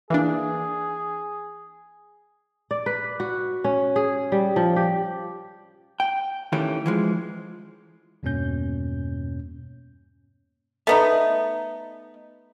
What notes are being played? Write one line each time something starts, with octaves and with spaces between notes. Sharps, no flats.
E3 A#3 D4 G#4
D5
B4
F#4
C#4
G#4
G3
F3
G4
G5
D#3 E3 A3 C#4 G4
E3 F3 G#3
E2 G2 B2 A#3 C#4 G6
A3 B3 D#4